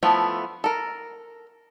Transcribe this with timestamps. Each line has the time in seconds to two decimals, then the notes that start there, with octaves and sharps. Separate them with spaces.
0.03 F3 A3 B3 E4
0.64 A4 A#4